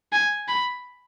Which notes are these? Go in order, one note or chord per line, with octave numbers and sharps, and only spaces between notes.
G#5
B5